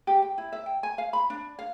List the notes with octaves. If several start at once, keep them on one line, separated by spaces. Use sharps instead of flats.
G4
G5
E4
E5
G5
G#5
F5
B5
D4
F5